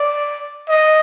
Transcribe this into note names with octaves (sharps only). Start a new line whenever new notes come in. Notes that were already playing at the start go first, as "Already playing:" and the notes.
Already playing: D5
D#5